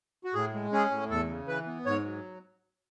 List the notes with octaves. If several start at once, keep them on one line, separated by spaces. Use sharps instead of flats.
F#4
A2 G#4
G#3
C#4 G#4
A2
E2 A4
C#3
E3 B4
B3
G#2 C#5
F#3